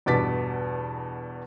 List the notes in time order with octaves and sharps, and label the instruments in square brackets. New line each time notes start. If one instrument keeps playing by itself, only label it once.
[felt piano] E2 G2 B2 D6 A6 B6